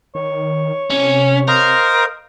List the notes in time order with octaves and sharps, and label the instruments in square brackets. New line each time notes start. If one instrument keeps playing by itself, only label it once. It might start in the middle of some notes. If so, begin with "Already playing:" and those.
[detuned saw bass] D#3 [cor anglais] C#5
[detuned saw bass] C3 [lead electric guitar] C#4
[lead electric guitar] A#4 [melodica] C5 D#5 F5